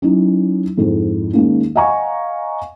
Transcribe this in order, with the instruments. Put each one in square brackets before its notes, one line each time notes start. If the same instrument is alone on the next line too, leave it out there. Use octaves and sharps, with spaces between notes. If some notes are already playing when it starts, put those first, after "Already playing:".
[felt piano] F#3 C#4 D#4 E4
F2 G#2 E4
D#3 G#3 A#3 C#4
D#5 F5 F#5 G#5 A#5 C#6